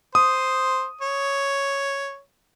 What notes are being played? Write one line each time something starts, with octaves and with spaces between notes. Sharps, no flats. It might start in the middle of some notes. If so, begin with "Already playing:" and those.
C5 D#6
C#5